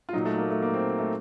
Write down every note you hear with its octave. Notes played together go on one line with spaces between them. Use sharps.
F4
A#2 F#3 D#4
A3
A#3
A3
A#3
C4
A3